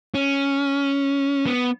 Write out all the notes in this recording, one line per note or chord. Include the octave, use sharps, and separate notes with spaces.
C#4
B3